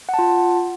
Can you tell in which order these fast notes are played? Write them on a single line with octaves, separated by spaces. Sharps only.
F#5 A5 F4